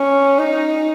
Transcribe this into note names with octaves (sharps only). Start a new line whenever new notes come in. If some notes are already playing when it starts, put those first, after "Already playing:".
Already playing: C#4
D#4